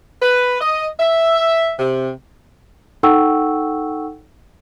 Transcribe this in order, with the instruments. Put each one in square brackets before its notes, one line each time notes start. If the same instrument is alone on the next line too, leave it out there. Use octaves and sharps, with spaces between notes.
[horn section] B4
D#5
E5
C3
[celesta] D#4 A4 F#5 G5 C#6 E6